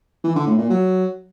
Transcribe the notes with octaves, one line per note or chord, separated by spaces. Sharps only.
E3
D3
A2
A#2
F#3